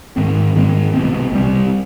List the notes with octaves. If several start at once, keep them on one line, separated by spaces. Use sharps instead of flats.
G#2 D#3 G#3 C4
G#2 D#3 G#3 C4
C2 B2 G3 C4
C2 B2 G3 C4